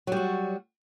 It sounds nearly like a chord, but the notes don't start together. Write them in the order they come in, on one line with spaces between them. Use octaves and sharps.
F#3 G3 F#4